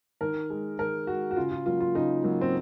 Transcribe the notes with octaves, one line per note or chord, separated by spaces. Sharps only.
D#3 A#4
G#3
D#3 A#4
G#3 F#4
F#4
C#3 F4
F4
F#3 A#3 F4
F4
C#3 D#4
F#3 A#3
C4